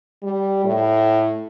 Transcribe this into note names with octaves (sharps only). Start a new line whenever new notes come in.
G3
A2